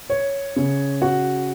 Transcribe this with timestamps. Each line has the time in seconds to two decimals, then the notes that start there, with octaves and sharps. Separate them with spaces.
0.10 C#5
0.56 C#3
1.02 F#4